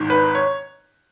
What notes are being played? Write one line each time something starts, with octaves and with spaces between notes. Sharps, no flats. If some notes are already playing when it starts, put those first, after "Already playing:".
Already playing: G#1 G#2 D#3
B4
C#5